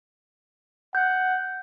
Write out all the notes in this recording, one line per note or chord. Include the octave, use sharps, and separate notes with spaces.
F#5 G6